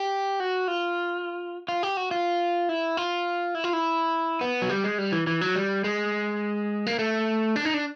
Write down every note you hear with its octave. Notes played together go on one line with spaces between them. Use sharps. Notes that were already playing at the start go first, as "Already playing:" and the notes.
Already playing: G4
F#4
F4
F4
G4
F#4
F4
E4
F4
E4
F4
E4
B3
F#3
G3
G#3
G3
E3
E3
F#3
G3
G#3
A#3
A3
D4
D#4
D4